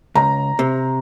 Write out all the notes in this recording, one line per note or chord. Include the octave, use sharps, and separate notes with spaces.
C#2 A#5
C3